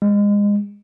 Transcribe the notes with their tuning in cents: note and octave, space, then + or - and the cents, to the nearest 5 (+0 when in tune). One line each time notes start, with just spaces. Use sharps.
G#3 -25